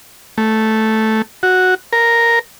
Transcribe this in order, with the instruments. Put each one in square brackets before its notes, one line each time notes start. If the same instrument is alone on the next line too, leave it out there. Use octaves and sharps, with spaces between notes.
[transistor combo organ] A3
F#4
A#4